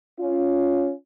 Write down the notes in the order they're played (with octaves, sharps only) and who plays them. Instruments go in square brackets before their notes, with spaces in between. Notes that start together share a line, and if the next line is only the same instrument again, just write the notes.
[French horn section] C#4 F4